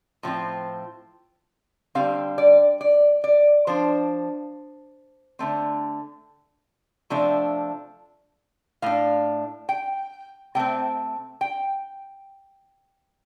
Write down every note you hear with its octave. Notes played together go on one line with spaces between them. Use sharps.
A2 F3 C4
D3 G3 C4 F5
D5
D5
D5
F3 D4 C5
D3 A3 C4
C3 F3 A3 D4
A2 A3 D4 F5
G5
C3 A3 C4 G5
G5